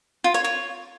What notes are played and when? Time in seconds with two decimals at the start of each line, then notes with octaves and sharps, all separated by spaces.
0.24 F4
0.34 C#5
0.44 C#5